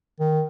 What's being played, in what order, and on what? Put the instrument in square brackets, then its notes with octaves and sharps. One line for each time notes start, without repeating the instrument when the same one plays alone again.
[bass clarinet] D#3